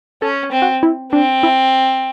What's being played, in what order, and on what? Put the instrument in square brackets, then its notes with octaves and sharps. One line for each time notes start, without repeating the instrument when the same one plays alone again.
[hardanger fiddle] C#4 [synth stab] A4
[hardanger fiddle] C4
[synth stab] F#4
E4
[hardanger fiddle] C4 [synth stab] D4
[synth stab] E4